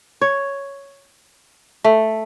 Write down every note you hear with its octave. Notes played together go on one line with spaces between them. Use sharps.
C#5
A3